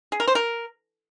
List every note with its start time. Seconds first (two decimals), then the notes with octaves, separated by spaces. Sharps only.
0.12 G#4
0.20 A#4
0.28 C5
0.35 A#4